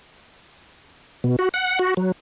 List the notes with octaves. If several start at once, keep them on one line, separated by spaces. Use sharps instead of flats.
B2
F#4
F#5
F#4
F#3